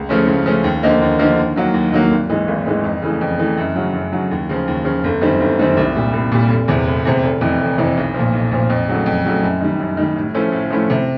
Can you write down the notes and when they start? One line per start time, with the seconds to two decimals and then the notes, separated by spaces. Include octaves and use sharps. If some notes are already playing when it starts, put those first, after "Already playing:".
Already playing: C#2
0.09 C#3 F3 A3 C#4
0.27 C#2
0.46 C#3 F3 A3 C#4
0.64 D#2
0.83 D3 F3 A#3 D#4
1.02 D#2
1.19 D3 F3 A#3 D#4
1.38 D#2
1.56 D#3 F#3 A#3
1.74 D#2
1.92 D#3 F#3 A#3
2.11 G#1
2.30 G#2 E3 G#3
2.48 G#1
2.66 G#2 E3 G#3
2.84 F2
3.02 C#3 E3 A3
3.21 F2
3.39 C#3 E3 A3
3.57 F#2
3.76 C#3 F#3
3.93 F#2
4.13 C#3 F#3
4.31 D#2
4.49 C#3 F3
4.67 D#2
4.85 C#3 F3
5.04 G1
5.21 F#2 D#3 G3 C4
5.40 G1
5.59 F#2 D#3 G3 C4
5.77 C2
5.95 A#2 G3
6.13 C2
6.32 A#2 G3
6.49 F1
6.68 E2 C3
6.87 F1
7.05 E2 C3
7.23 F1
7.41 F2 C3 E3
7.60 F1
7.78 F2 C3 E3
7.97 B1
8.14 A#2 F3
8.33 B1
8.52 A#2 F3
8.70 F2
8.88 C#3 F#3 A3
9.06 F2
9.25 C#3 F#3 A3
9.43 F#2
9.61 D#3 G3
9.79 F#2
9.97 D#3 G3
10.16 A2
10.34 F3 A3 C#4 E4
10.52 A2
10.70 F3 A3 C#4 E4
10.90 C3